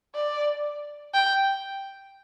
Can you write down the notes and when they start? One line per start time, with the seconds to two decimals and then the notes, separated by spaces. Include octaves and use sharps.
0.15 D5
1.14 G5